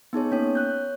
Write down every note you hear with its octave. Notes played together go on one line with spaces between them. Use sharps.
B3 D#4 G#4 C#5
A#3 C#4 C#5
C#5 F#6 G6